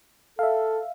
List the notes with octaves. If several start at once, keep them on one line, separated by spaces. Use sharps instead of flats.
A4 E5 F5